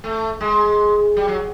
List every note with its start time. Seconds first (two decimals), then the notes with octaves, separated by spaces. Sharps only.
0.04 A3
0.41 G#3
1.17 G3
1.28 F#3